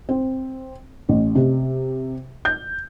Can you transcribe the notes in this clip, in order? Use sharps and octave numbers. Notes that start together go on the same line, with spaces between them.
C4
A1
C3
G6